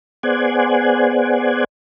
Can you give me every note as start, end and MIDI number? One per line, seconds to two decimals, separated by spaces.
0.23 1.64 59
0.23 1.64 68
0.23 1.64 72
0.23 1.64 74
0.23 1.64 78
0.23 1.64 80